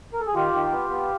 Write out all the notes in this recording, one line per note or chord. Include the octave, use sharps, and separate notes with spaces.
A#4
A4
G#4
D#3 F4 G4
D#3
B3
B3